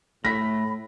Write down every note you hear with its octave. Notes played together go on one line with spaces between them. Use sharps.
A2 A3 B5 A#6 B6